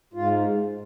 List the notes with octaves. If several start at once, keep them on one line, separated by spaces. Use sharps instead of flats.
G#2 F4